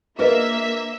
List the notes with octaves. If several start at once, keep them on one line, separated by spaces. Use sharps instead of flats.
A#3 D4 F4 G#4 A#4 B4 D#5 E5